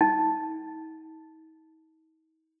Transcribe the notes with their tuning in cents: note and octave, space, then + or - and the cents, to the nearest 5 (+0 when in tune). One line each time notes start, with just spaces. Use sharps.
D#4 +40